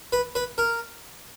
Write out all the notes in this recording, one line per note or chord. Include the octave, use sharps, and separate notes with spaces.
B4
B4
A#4